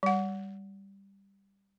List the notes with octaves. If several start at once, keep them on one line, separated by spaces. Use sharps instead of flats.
G3 F#5